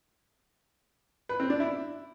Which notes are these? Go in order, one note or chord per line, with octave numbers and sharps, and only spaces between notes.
B4
C4
D4
E4